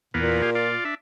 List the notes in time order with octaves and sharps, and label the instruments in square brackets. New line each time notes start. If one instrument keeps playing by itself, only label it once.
[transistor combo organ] E2 A#3 B3 [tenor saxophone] A#2
[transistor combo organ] G4 G#4 F5
F4 D5
D4 E5